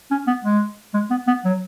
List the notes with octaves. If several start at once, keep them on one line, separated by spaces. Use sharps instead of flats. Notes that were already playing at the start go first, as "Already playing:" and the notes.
C#4
B3
G#3
G#3
B3
B3
F#3